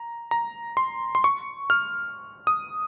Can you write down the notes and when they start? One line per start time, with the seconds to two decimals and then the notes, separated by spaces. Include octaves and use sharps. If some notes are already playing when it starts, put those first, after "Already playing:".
Already playing: A#5
0.31 A#5
0.77 C6
1.15 C6
1.24 C#6
1.70 F6
2.47 D#6